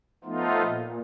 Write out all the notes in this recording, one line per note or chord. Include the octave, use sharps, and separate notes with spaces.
F3 A3 B3 D#4 F4
A#2